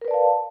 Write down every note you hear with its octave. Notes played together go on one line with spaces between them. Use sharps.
A#4 B4 D5 F5 A5